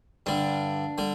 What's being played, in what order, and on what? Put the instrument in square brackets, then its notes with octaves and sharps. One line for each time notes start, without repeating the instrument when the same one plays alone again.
[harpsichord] G2 D3 G3 [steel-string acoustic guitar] D4
[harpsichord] D3 G3